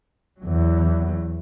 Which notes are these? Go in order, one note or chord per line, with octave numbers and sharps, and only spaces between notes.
E2 F#3